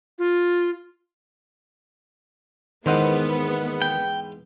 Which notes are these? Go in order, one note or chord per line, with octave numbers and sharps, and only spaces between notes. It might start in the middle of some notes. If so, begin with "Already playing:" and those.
F4
E2 G#2 D#3 E3 B3 C5 F#5
G5